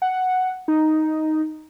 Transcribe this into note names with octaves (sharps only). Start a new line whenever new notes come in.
F#5
D#4